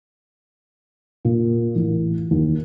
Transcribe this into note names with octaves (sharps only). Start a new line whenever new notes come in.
A#2
A1
D#2